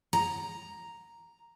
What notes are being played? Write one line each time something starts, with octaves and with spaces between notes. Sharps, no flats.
A#5